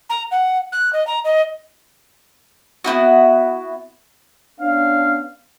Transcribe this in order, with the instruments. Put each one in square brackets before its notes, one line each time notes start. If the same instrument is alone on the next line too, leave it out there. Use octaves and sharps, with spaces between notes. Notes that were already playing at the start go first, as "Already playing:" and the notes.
[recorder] A#5
F#5
F#6
D#5
A#5
D#5
[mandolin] B3 C4 E4 F#4
[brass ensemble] B3 C#4 D4 F5